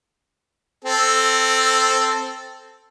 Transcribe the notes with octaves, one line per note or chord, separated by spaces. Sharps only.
C4 A4